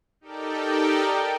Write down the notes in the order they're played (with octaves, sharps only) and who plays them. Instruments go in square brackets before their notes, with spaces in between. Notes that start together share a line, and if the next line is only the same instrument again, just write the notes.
[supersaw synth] D#4 G4 A4 A#4 D5 G5